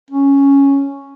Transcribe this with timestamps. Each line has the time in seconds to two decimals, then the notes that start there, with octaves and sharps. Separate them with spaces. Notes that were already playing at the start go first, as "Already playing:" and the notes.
0.11 C#4